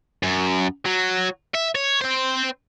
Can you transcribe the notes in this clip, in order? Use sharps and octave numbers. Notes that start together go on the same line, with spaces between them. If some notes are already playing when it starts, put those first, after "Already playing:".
F#2
F#3
E5
C#5
C4 C5